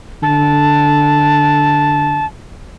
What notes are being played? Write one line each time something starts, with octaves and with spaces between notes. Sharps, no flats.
D3 A5